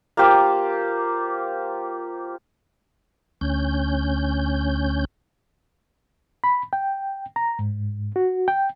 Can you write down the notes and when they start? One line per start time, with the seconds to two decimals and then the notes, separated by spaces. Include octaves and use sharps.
0.17 A#3 F4 G4 C5
3.41 D2 C#4 G6
6.44 B5
6.73 G5
7.36 A#5
7.59 G#2
8.16 F#4
8.48 G5